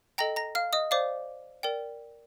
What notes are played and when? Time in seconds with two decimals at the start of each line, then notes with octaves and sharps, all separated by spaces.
0.18 A4 D#5 G5 A#5 A#6
0.36 A#5 A#6
0.55 F5 F6
0.73 D#5 D#6
0.91 C5 D5 F5 D6
1.63 A#4 D5 G5